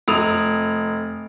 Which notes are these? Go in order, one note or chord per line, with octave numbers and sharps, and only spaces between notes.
F1 D#6 F7